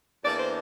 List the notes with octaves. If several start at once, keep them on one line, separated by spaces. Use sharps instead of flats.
E2 E3 A#3 D4 D5
C5